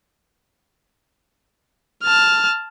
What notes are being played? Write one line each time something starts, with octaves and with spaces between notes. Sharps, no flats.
A5 F6